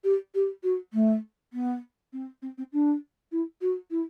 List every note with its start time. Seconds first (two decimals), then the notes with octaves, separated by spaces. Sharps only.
0.04 G4
0.34 G4
0.63 F#4
0.93 A3
1.53 B3
2.13 C4
2.42 C4
2.58 C4
2.73 D4
3.32 E4
3.61 F#4
3.90 E4